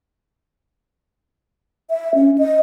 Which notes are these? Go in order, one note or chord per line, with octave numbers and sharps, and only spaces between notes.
E5
C#4
D#5